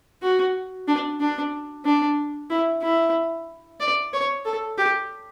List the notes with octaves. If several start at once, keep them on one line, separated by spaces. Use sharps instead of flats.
F#4
D4
D4
D4
E4
E4
D5
C#5
A4
G4